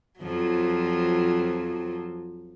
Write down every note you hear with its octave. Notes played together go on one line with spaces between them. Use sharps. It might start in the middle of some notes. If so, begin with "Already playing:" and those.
F2 F3 F#3